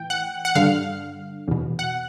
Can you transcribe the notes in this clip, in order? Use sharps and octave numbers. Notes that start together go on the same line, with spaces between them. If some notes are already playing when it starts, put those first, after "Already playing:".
Already playing: A2 E3 G5
F#5
F#5
G2 D3 F5
E2 B2
F#5